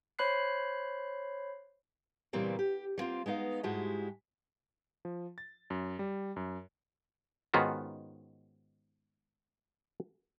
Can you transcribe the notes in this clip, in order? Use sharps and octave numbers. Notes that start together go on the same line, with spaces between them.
C5 C#5 B5 F#6 C7
A#2 C#3 E3 G3 A#3 C4
G4
G3 A#3 C4 F4
G#3 B3 D#4 F5
G#2 G#3 E4 F#4 G4 A5
F3
A6
F#2
G3
F#2
G#2 D#3 B3 C#4 F4 F#4